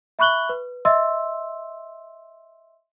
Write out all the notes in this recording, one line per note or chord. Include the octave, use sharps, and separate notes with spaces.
E5 B5 C#6 F#6 F#7 G7
B4
D#5 E5 C6 E6